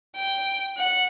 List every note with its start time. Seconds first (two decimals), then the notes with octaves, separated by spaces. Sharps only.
0.16 G5
0.78 F#5